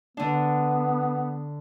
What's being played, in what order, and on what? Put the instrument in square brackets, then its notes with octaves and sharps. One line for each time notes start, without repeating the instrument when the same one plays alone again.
[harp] D3 D4 [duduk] B3